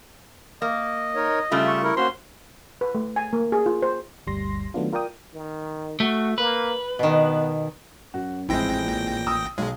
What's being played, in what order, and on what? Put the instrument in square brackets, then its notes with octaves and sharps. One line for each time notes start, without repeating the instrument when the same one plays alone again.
[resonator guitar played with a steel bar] A#3 [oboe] D#5
[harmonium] D#4 A#4 C#5
[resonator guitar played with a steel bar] C#3 G3 A3 [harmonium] F4 E5
[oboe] C#6
[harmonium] E4 A#4
[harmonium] A#3 F#4 C5 [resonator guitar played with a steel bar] C#4 [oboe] C6
[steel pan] B4
A3
G#5
A#3
G#4
F4
C5
[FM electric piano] G1 D2 G3 C6 A#6
D#3 F#3 A3 B3 D4 F4
F4 A#4 D5 G5 D#6
[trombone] D#3
[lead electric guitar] A3 [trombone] F#4
[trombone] A#3 [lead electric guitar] B4
[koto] B2 D#3 [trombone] B3
[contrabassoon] F#2 [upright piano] F#4
[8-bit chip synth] A1 G5 A#6 [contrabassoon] F2 [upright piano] G#3 C4 E4
[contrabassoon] A#2
[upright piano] D#6 E6
[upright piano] B1 [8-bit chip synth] G#3